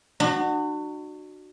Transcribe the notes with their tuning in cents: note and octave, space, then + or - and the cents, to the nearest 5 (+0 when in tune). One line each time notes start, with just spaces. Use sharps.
D4 +40 F#4 +0